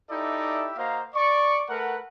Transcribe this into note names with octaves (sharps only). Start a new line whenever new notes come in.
D#4 E4 G4 A4 D5 E5
A#3 F#4 C5 D#5 F5 A#5
D5 C#6
A3 A#4 B4 F#5